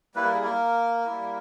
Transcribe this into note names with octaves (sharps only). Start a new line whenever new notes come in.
G3 A#3 E4 B4
A#4
G#4
A#3 A#4
G3 A#3 E4